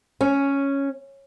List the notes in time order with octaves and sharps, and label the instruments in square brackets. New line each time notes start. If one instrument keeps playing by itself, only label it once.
[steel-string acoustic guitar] C#4